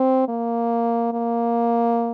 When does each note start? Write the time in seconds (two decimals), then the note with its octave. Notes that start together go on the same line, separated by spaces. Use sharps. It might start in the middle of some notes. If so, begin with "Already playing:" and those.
Already playing: C4
0.28 A#3
1.13 A#3